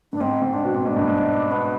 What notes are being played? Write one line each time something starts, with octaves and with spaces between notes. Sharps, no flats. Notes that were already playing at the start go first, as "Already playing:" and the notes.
G2 D4
G#2 C4
G#2
D4
B2
C4
G#2 D4
G2
G#2
B3